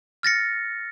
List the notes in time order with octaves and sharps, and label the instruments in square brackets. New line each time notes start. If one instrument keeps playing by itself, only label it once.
[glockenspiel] F6 A6 A#6 C#7